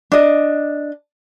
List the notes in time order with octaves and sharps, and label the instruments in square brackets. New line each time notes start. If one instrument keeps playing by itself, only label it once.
[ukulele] D4 D#5